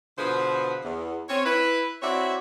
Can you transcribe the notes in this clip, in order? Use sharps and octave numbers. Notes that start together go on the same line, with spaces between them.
B2 D3 F3 G#4 B4 C5
E2
C4 C#4 C#5
E4 B4
C4 E4 F#4 C#5 D5 E5